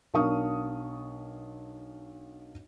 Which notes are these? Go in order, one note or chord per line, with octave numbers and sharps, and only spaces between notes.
B1 D4 A#4 F5 C#6 D#6